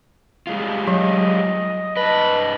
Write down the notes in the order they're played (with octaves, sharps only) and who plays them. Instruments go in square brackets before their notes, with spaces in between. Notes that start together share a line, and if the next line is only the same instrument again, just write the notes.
[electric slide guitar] G3 G#3 F4
[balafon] F#3 [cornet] D#5
[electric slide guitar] G2 D#5 [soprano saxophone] B4 [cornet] A5